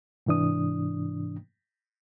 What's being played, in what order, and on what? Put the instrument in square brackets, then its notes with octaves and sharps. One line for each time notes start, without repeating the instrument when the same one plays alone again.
[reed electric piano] G#2 C3 E3 D4 D#6